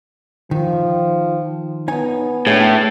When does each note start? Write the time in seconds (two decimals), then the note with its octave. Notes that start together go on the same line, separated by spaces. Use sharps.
0.51 D#3 F3
1.88 B3 D#4 C#5 G#5
2.47 A2 D4 G#4